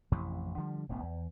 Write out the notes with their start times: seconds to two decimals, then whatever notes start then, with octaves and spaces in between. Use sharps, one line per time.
0.12 A1 F2 C3 E3
0.57 D3 F3 G3
0.89 E1 A1 A2 B3
1.03 E2